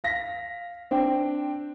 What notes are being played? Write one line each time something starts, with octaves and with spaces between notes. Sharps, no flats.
F5 A#6 B6
C4 D4 G5